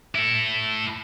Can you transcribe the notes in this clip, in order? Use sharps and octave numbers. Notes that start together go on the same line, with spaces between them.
E4 A4